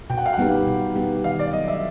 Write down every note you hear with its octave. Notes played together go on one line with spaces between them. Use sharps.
B2 G5
F#5
F5
F#5
G3 B3 D#4 G4
B2
G3 B3 D#4 G4
D#3 F5
D5
F#3 B3 D#5
E5